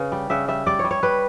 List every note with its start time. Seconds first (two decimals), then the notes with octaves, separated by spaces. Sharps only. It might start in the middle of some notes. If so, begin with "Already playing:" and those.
Already playing: C#3 B4
0.12 G3
0.30 C#3 E5
0.48 G3 E5
0.66 G3 D5
0.79 C#5
0.84 G3
0.91 C#5
1.03 G3 B4